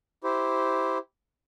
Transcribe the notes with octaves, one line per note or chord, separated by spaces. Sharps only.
E4 G4 C5